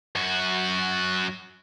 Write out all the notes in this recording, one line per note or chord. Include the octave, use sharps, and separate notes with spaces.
F#2 F#4